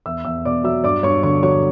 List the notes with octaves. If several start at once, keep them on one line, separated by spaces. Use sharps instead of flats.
E2 E5 E6
E2 E5 E6
B2 D5 D6
F#3 E5 E6
G2 D5 D6
G2 C#5 C#6
D3 C#5 C#6
F#3 C#5 C#6